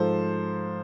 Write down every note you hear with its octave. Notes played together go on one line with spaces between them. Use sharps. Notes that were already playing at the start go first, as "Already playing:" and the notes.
Already playing: G#2 F3 A4 C5